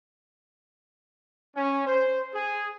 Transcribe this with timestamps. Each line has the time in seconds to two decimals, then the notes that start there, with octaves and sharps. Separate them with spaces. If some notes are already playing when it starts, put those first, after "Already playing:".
1.55 C#4
1.86 C5
2.33 G#4